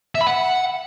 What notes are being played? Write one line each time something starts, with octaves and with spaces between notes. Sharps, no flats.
E5
B5
F#5